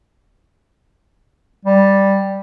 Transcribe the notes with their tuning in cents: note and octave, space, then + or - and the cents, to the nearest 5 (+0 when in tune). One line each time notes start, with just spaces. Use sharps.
G3 +0